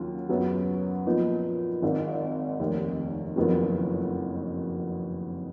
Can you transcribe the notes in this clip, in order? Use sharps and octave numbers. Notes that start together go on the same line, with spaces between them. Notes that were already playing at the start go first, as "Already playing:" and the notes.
Already playing: D#2 C#3 F#3 F4
F#2 C#3 F#3 B3
A#2 F3 B3 D#4
G#1 G#2 D#3
F1 D#2 D#3
F#1 F2 D#3 F#3 B3